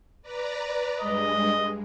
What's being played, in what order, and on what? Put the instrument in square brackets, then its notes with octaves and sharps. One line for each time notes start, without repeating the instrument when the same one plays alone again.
[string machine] B4 D5 A#5
[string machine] G2 G#3 [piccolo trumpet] D#5